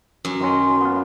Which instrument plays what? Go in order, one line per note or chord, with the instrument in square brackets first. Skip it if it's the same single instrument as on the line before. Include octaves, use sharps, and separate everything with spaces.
[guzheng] F#2
[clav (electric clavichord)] D#3 F#3 C#4 [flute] C6
[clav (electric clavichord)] B3 F4